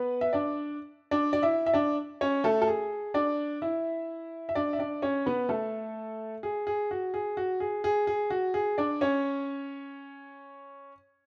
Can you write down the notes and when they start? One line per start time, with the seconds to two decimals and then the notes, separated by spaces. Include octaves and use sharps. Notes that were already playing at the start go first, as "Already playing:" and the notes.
Already playing: B3 B4
0.21 E5
0.33 D4 D5
1.11 D4 D5
1.33 D5
1.42 E4 E5
1.66 E5
1.73 D4 D5
2.21 C#4 C#5
2.44 A3 A4
2.62 A4
2.68 G#4
3.14 D4 D5
3.62 E4 E5
4.49 E5
4.55 D4 D5
4.73 E5
4.79 D4 D5
5.02 C#4 C#5
5.26 B3 B4
5.49 A3 A4
6.43 G#4
6.67 G#4
6.91 F#4
7.14 G#4
7.37 F#4
7.60 G#4
7.84 G#4
8.07 G#4
8.30 F#4
8.54 G#4
8.78 D4 D5
9.01 C#4 C#5